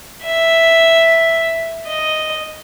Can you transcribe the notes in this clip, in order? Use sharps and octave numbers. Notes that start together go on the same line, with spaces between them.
E5
D#5